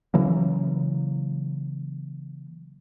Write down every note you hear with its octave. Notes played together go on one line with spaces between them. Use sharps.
C#3 E3 F#3 A#3